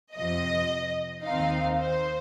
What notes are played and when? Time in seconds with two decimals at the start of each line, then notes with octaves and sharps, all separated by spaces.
0.15 F2 C3 F3 D#5
1.25 D#2 D#3 C4 D#4 F5
1.80 C5